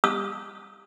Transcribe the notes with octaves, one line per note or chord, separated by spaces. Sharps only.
D#6